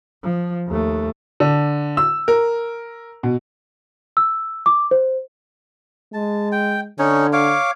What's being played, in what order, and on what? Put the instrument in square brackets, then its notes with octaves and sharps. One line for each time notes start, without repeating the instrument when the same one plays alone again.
[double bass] F3
D#2 A3
[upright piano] D3
E6
A#4
B2
[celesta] E6
D6
C5
[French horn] G#3 [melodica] A5
[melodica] G5
[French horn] D3 [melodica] C#4 D#4 C#5
[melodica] C#5 F5 D6